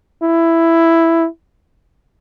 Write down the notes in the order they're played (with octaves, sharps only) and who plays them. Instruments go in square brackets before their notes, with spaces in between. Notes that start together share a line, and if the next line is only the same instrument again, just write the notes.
[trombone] E4